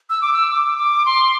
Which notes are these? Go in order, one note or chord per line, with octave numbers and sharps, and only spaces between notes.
E6
D6
E6
D6
D6
C6